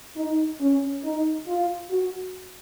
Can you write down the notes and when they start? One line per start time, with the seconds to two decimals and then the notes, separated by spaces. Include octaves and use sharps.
0.17 D#4
0.61 C#4
1.05 D#4
1.48 F4
1.91 F#4